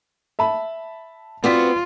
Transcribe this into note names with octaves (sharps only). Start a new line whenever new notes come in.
E5 A5 B5
B3 C4 F4 F#4 D5 B6